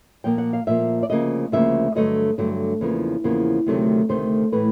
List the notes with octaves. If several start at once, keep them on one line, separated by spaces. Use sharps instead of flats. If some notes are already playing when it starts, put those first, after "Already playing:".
A#2 F3 A#3 G5
F#5
F5
A#2 F3 A#3 E5
D5
D2 C#3 F3 A#3 D#5
D2 C#3 F3 A#3 E5
G2 D3 F#3 A3 D#5
G2 D3 F#3 A3
E2 C#3 F3 A#3
E2 C#3 F3 A#3
D2 C3 D#3 F#3 A3
D2 C3 D#3 A3 C5
A2 E3 A3 B4